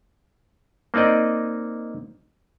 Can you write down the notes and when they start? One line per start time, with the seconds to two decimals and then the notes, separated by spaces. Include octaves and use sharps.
0.94 A#3 C4 D#4 D5 D#5